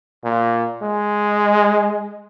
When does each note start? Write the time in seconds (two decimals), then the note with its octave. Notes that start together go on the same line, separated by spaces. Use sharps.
0.24 A#2
0.82 G#3